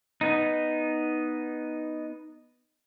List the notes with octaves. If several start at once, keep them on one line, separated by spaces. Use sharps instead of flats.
B3 D#4